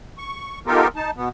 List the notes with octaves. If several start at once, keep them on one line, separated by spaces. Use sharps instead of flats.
C#6
B3 D#4 F4 G4 A4 A#4
D#4 A5
B2 B3